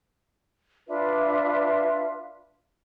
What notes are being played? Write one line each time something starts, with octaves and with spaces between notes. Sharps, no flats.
D4 F4 B4 E5